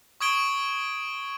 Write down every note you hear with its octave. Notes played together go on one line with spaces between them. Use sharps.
C#6 D#6 G#6 D7 G7